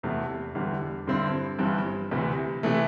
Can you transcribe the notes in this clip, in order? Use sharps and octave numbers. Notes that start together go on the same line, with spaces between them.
E1 E2 C3 A3
E1 E2 D3 G3
G2 D3 C4 E4
G1 G2 E3 C4
D2 C3 E3
C3 E3 A3